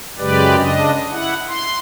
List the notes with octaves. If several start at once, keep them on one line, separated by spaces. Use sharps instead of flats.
F#2 C#3 G#3 G4 B4 D5
C#3 D4 D#5
E4 F#5
C6